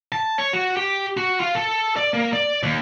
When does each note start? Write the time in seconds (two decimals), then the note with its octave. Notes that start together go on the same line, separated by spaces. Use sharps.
0.12 A5
0.38 C#5
0.53 F#4
0.77 G4
1.17 F#4
1.40 F4
1.55 A4
1.96 D5
2.14 A#3
2.33 D5
2.63 D#2